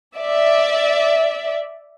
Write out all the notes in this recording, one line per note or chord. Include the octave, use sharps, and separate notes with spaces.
D5 E5